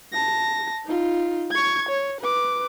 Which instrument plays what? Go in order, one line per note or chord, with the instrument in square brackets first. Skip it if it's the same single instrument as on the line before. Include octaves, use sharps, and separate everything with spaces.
[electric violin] A5 A#6
D#4 F4
C#6 G#6
C#5
B4 D6